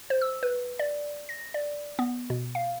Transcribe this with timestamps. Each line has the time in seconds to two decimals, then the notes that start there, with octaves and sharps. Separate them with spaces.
0.10 C5
0.21 E6
0.43 B4
0.79 D5
1.29 A#6
1.54 D5
1.99 B3
2.30 B2
2.55 F5